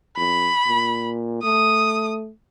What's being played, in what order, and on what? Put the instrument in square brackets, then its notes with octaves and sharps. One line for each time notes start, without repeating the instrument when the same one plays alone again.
[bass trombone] F2 [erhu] B5
[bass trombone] A#2
[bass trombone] A3 [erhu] D#6